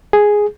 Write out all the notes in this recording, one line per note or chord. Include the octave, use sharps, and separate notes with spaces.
G#4